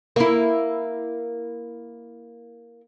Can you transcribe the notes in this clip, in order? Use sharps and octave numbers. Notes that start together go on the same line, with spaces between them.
A#3 E4